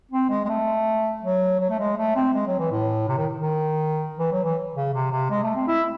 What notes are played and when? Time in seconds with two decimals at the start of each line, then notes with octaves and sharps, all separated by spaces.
0.11 C4
0.30 G#3
0.45 G#3
0.49 A3
1.23 F#3
1.60 F#3
1.70 A3
1.78 G#3
1.97 A3
2.16 C4
2.33 G#3
2.46 F#3
2.59 E3
2.71 A2
3.08 C3
3.17 D#3
3.36 D#3
4.19 E3
4.32 F#3
4.44 E3
4.74 C#3
4.93 C3
5.11 C3
5.30 G#3
5.43 A3
5.55 C4
5.68 E4